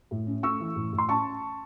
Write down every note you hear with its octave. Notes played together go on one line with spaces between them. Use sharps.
A2
C#4
A3 C#6 E6
E3
A2
A2
C6
C#4 A5 C#6